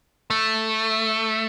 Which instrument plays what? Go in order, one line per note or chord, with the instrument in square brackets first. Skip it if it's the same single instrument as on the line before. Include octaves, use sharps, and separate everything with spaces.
[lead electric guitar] A3